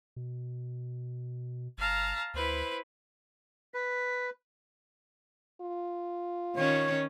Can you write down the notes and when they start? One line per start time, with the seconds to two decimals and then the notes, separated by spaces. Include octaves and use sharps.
0.16 B2
1.78 G1 F5 A5 A#5
2.34 D2 E4 B4 C5
3.74 B4 B6
5.61 F4
6.56 D#3 C#4 C#5